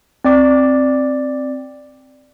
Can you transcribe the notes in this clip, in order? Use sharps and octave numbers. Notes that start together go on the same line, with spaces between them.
C4 D5 D6